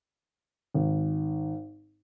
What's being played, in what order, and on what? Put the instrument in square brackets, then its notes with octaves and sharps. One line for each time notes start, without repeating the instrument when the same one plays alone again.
[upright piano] G#1